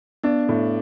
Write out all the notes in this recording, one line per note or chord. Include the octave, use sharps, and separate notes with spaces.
B3 D4
A2